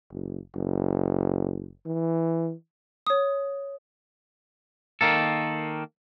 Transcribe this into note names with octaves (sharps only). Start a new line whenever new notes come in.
F#1
F#1
E3
C#5 D#6
D#3 A#3 A4